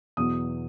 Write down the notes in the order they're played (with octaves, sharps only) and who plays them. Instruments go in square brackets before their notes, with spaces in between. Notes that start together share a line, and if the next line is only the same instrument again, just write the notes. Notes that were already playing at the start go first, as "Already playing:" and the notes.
[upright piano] E2 B2 F#3 B3 D#6